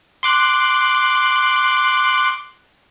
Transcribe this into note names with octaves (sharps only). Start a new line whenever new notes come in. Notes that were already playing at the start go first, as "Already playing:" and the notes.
C6 D6 F#6